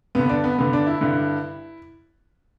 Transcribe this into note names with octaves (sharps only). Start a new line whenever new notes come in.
G2 D3 B3
D4
B3
G2 D3 B3
D4
E4
G2 D3